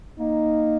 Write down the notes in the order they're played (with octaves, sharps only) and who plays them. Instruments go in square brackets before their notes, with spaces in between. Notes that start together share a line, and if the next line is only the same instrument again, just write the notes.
[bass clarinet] A#3 [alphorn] D#4